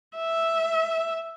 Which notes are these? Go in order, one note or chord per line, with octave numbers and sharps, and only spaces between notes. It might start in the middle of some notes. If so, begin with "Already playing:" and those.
E5